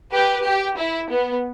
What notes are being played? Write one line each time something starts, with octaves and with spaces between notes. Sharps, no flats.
G4 B4
G4
E4
B3